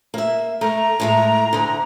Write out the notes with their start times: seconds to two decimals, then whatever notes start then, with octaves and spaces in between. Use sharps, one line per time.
0.14 A#3 E5
0.61 A3 A#5
1.00 A2 G#3 A3
1.53 D2 D3